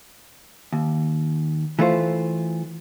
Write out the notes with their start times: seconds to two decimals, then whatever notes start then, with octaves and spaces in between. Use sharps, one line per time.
0.73 D#2
1.79 E3 A3 F4 C5